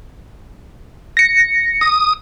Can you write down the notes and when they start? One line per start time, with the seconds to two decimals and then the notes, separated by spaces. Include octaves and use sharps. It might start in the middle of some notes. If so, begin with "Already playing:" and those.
1.17 A#6 C#7
1.81 D#6